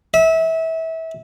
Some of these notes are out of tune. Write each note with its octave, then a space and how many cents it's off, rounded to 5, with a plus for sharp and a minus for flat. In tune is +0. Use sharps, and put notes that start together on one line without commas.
E5 -25